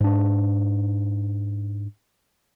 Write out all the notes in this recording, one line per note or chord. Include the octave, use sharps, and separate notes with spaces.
G#2 D4